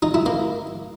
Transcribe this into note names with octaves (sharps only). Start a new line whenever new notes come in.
D#4
E4
A#3